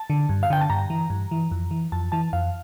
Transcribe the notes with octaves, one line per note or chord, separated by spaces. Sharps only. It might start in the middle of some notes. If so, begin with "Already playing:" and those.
Already playing: A5
D3
G2
F5
D3 G5
A5
G2 A#5
E3
G2
E3
F2
E3
F2 A5
E3 A5
F2 F5